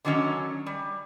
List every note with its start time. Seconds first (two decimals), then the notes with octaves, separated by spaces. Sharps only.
0.05 D3 D#3 F#3 B3 C#4
0.66 G3